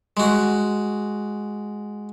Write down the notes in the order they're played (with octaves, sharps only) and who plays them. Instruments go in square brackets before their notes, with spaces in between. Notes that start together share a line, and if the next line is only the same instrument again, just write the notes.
[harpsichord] G#3 F#4